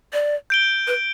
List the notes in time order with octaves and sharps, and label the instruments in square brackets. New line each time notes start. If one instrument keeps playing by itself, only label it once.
[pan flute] D5
[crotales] G6 D7 G7
[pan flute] B4